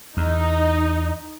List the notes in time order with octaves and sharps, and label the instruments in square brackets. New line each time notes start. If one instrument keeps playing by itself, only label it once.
[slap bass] E2 [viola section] D#4